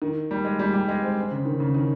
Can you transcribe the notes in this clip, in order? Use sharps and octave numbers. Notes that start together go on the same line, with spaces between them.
D#3
G3
G#3
G3
G3
G#3
C4
C4
C#3
D#3
C#3
D#3